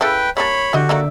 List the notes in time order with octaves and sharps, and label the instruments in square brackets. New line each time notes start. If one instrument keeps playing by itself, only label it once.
[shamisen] C#3 E4 A4 [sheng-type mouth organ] B4 G5
[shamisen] G3 A#3 D4 [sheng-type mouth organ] C#5 B5
[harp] D3 G4 [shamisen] E3 D#5 [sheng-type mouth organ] F#4
[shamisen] A3 A#3 D#4 [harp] D5 E5